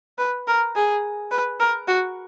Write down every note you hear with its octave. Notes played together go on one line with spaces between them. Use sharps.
B4
A#4
G#4
B4
A#4
F#4